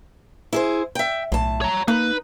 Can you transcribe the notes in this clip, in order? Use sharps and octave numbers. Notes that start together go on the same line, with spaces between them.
E4 G#4 C5
E5 G5
B1 A2 A5
C#5 A#5
A#3 D#4 B4